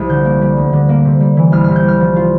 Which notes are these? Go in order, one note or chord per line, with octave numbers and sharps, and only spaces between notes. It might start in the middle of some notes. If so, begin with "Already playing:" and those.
Already playing: C2 F3
D3 G6
A#3
G3
D2
D3
A#3
C3
G3
E3
C2 F6
C3 F6
G6
G3 F6
F3
F4